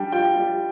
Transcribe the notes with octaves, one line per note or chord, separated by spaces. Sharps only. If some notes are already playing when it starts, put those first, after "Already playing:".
Already playing: G3 D4 G5
F4 G5
G3